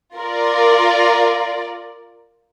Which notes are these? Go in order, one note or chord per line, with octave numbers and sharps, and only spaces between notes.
F4 A#4 D5